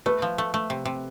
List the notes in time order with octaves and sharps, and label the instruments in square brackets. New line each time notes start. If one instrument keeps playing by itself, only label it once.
[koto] A3 [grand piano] B4
[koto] F3
A3
A3
C3
C3